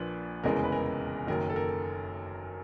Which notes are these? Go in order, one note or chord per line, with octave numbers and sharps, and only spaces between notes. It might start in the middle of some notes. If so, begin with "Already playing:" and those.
Already playing: A#1 A#2 F3 A#3 D4 B4
F1 E2 C#3 E3 G#3 A#4
B4
A#4
F#1 F#2 D#3 A#4
A4
A#4